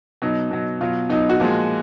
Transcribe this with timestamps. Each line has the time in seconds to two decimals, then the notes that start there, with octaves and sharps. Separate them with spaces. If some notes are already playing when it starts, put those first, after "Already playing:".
0.22 B2 F#3 D#4
0.51 B2 F#3
0.81 B2 F#3 F4
1.09 B2 F#3 D#4
1.29 F#4
1.40 A#2 F3 G#3